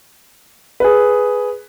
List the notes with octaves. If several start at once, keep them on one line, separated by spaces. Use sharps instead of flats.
G#4 B4